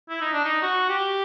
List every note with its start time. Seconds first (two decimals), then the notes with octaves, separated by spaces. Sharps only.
0.09 E4
0.21 D#4
0.33 D4
0.44 D#4
0.62 F#4
0.89 G4